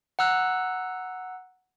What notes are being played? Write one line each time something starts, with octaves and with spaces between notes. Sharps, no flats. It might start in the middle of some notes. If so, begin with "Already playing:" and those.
F#5 A#5 E6 F#6